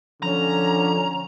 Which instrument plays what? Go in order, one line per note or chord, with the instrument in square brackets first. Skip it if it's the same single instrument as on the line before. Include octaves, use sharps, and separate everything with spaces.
[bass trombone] D3 [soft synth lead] F3 [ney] C#4 [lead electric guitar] A#5